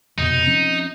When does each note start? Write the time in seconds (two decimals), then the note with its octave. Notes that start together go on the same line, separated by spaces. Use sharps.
0.18 F1 B2 D#4
0.47 F3 C4 C#4